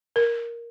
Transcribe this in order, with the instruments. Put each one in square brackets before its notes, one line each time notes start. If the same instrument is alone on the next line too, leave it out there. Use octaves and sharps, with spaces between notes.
[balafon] A#4